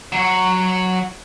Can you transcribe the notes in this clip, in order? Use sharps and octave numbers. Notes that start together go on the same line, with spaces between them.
F#3 C#5